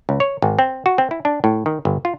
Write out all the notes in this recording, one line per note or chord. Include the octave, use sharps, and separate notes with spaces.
C#2
C#5
G#1
C4
F#4
C4
E4
D4
A2
D#3
G1
F4